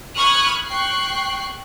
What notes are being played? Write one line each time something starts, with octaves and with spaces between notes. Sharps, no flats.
B5 C#6 D#6 F6 F#6 G#6
G5 C#6 F#6 C7